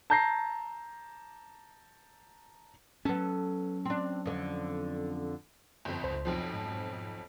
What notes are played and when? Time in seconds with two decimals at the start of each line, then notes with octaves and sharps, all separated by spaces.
0.10 A5 A#5 G6 A#6 C7
3.05 F#3 B3 C#4 A4
3.85 C4 D4
4.26 F2 D3
5.85 G1 F2
6.03 C#2 C5
6.25 B1 F2 F3
6.54 G#2